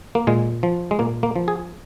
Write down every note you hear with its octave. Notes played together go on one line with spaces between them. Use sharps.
A#3
A#2 G#3
F3
G#3
A#2 A#3
A#3
F3
G#4